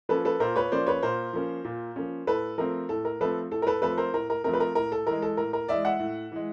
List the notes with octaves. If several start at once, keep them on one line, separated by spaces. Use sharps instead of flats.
F3 A#3 C#4 A4 B4
A4 B4
A#2 A#4 C5
B4 C#5
F3 A#3 C#4 C5 D5
B4 C#5
A#2 A#4 C5
F3 A#3 C#4
A#2
F3 A#3 C#4
A2 A4 B4
F3 A3 C4 A#4
A2 A4
A#4
F3 A3 C4 A4 B4
A2 A4
A#4
A4 B4
F3 A3 C4 A4 B4
A#4 C5
A2 A#4
A#4
F3 A3 C4 A#4
B4
A#4
A2 A#4
A4
E3 G#3 A#4
A4
A2 A#4
A#4
E3 G#3 D5 E5
E5 F#5
A2
E3 G#3